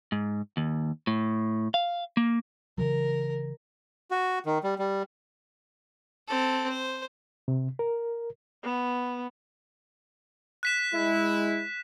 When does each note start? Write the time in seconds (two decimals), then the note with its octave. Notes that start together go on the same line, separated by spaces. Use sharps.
0.12 G#2
0.57 D#2
1.07 A2
1.74 F5
2.17 A#3
2.78 C#3 E3 F#3 A#4
4.11 F#4
4.46 D#3
4.64 G3
4.79 G3
6.27 C4 A4
6.69 C5
7.48 C3
7.79 A#4
8.63 B3
10.63 F#6 B6 E7
10.94 G#3 E4